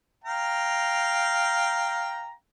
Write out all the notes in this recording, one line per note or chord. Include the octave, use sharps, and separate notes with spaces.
F5 G5 A#5